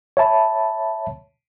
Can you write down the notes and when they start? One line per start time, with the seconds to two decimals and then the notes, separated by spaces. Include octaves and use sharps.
0.17 C#5 E5 A5 B5